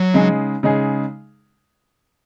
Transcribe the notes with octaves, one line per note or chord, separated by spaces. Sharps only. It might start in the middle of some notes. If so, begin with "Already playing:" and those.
Already playing: F#3
C#3 G#3 D#4 G#4
C#3 G#3 D#4 G#4